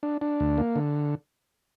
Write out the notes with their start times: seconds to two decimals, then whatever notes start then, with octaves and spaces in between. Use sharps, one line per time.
0.03 D4
0.21 D4
0.40 D2
0.58 A#3
0.76 D3